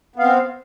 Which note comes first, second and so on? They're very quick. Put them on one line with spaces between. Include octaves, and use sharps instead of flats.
B3 F5 C4